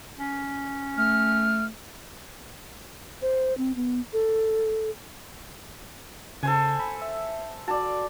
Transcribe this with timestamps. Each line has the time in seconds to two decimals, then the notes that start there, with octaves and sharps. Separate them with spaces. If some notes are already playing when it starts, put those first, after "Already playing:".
0.19 C#4
0.98 A3 F6
3.22 C5
3.57 C4
3.76 B3
4.13 A4
6.43 C#3 A4 C5 G#5
6.80 B5
7.02 E5
7.68 F#4 D5 A5